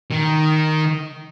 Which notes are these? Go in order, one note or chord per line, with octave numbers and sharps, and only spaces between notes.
D#3